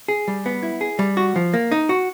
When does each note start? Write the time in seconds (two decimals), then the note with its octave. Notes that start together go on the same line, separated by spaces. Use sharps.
0.08 G#4
0.28 G3
0.46 B3
0.63 E4
0.81 G#4
0.99 G3
1.17 F#4
1.36 F3
1.54 A#3
1.72 D#4
1.89 F#4